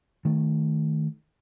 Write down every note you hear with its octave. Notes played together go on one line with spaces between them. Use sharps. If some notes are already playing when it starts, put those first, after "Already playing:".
D#3 A3